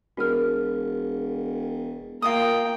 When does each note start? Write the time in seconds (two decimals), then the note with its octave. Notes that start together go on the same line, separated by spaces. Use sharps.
0.17 E1 F#4 A#4 F6
2.22 A#3 F4 D#5 G5 D#6